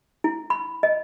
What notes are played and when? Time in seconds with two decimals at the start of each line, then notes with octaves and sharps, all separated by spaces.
0.24 E4
0.50 B5
0.83 D#5